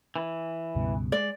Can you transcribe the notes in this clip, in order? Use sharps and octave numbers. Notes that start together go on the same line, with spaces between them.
E3
C#2 G2 B2
G#3 D5